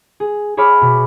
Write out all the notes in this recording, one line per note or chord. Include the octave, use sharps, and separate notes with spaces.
G#4
G#4 C#5 E5 B5 D6 F6
B2